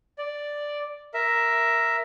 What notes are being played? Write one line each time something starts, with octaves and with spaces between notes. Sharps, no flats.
D5
A#4 E5